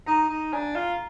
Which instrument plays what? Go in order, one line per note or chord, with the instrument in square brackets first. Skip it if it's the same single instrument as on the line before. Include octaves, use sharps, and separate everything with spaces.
[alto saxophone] D#4 [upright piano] A#5
[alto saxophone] D#4
[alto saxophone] D4 [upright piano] G#5
[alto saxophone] F4